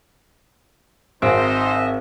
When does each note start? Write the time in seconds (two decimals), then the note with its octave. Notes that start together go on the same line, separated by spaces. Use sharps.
1.22 G#1 C4 D#4 C5 D#5 E5